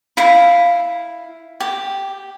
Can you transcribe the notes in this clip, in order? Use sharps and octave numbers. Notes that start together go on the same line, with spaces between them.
E4 F5
G4